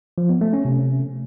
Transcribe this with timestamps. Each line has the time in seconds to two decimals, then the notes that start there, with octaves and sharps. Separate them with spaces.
0.18 F3
0.29 B3
0.41 A3
0.53 C#4
0.65 C3